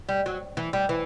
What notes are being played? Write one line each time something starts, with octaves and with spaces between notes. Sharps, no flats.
G3
F#3
E3
G3
E3